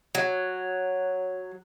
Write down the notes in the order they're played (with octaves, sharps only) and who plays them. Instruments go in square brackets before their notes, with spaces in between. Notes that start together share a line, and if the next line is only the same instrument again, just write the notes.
[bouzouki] F#3